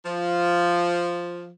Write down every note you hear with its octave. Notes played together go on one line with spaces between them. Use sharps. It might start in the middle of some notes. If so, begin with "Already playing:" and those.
F3